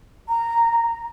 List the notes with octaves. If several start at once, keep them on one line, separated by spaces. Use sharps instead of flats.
A#5